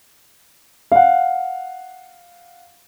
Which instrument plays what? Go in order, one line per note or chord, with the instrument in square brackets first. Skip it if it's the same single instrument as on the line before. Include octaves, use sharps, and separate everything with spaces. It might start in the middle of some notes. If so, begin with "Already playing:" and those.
[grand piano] F5 F#5